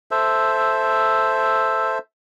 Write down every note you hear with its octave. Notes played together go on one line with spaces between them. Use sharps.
A4 C5 E5